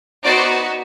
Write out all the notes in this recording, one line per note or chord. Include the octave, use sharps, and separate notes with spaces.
B3 D#4 F#4 C5 D5